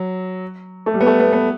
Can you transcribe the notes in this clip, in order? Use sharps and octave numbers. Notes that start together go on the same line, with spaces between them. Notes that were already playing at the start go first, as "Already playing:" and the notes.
Already playing: F#3
A3
G3
B3
A3
B3
B3